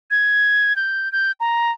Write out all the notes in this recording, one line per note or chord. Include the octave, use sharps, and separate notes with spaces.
G#6
G6
G6
A#5